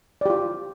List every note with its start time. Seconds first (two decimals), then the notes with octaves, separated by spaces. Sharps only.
0.21 D5
0.26 G4
0.30 F4